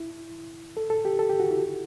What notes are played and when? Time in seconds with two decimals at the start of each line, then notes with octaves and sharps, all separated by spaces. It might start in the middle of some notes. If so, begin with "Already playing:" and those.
Already playing: E4
0.77 A4
0.90 A4
1.05 G4
1.19 A4
1.29 G4
1.40 F#4
1.51 E4